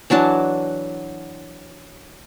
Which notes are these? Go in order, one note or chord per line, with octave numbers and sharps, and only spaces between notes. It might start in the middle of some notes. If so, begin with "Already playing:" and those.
E3 F#3 D4 A5